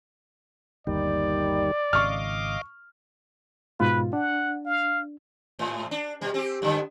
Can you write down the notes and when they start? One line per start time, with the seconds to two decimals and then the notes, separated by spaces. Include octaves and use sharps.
0.87 G1 D#2 D#3 G3 D5
1.93 G#1 C#3 D#5 F5 C#6 D6 F6
3.80 G#2 B2 F4 B4
4.13 D4 F#5
4.66 F5
5.59 G#2
5.91 D4
6.21 B2 G3
6.34 C4 G4
6.62 F#2 D3